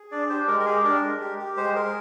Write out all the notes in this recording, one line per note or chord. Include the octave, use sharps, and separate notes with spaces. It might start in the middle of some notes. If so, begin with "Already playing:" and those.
Already playing: G#4
D4 D5
G4 C5
G#3 A#4
A#4
G4 G#4
D4 A#4
G#3
G4
G4
G#3 C5
G#4 A#4